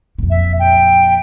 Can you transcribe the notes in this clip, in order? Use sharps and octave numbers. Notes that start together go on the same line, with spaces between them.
F2 A#2
E5
G5